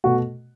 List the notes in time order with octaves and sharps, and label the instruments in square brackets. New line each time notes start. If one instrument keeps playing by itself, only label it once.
[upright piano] B2 A3 F#4